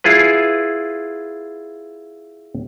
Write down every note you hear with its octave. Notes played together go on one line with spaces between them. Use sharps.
E4 F4 G#4 B4